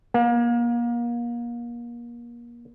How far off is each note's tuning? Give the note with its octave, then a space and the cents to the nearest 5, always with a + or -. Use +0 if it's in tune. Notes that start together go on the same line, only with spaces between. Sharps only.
A#3 +30